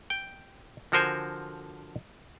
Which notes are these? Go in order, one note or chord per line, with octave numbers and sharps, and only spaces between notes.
G5
D3 F3 F#4 A#4 C5 G#5